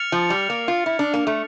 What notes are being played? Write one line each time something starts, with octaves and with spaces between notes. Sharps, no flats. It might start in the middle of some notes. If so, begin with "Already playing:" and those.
Already playing: F6 A6 C#7 F7
F3
G3
A#3
F4
E4
D4
A#3
A3